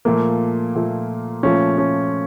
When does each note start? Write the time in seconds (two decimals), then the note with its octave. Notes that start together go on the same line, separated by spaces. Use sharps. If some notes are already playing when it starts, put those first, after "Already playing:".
0.05 A#2 F3 A3 A#3
0.75 A#2 F3 A3
1.43 A#2 F3 A3 C#4
1.78 C#4